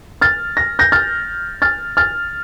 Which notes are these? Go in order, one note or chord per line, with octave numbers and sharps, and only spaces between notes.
F6 A6
A#6
G6 A#6
F6 A6
F6 A6
F6 A6